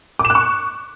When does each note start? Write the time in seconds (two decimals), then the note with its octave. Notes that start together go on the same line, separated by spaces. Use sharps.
0.19 D6
0.25 E7
0.30 F#6
0.35 C#6